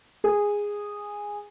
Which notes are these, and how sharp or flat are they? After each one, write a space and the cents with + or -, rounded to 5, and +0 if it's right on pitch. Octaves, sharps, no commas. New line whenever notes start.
G#4 -10